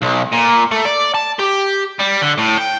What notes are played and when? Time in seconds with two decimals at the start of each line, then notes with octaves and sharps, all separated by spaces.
0.02 B1
0.33 A#2
0.71 A3
0.85 D5
1.15 A5
1.39 G4
2.00 G3
2.22 D3
2.38 A2
2.58 G5